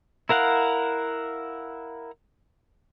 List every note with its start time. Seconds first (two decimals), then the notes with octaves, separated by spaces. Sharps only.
0.29 E4 A#4 F5 F#5